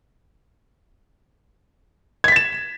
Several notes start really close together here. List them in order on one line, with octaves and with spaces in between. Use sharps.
G#6 B6 A6 E7